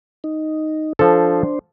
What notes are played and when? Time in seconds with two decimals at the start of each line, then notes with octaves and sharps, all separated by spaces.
0.24 D#4
0.99 F3 D4 A4 C5